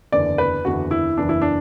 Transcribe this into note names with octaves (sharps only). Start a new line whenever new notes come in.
F#1 E2 D3 D5
B4
F#1 E2 D3 F#4
E4
F#1 E2 E3 D4
E4
D4